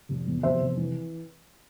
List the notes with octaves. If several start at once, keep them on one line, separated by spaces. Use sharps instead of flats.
F1
E2
F1 C5 E5
F1
E3